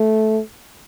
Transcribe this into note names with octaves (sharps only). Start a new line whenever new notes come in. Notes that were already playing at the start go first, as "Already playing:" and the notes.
Already playing: A3